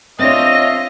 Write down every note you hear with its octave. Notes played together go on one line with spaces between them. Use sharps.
C4 D4 F4 C#5 D#5 E5 A#6